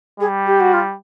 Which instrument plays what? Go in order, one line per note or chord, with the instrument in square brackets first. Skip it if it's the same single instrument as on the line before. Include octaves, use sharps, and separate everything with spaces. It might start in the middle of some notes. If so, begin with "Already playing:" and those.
[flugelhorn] G3 [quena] G#4
[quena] G4
F#4
F4